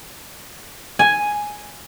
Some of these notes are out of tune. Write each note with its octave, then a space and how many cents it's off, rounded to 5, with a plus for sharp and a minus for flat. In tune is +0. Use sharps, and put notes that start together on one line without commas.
G#5 +0